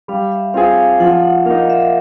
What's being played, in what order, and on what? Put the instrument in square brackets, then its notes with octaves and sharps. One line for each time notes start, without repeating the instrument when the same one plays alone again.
[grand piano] G3 [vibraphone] F5
[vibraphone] E5
[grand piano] C4 F4 G#4 [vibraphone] F5
[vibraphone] F5
[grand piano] F3 [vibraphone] F#5
[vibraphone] F#5
[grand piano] A#3 D#4 [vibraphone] F5
[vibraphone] E5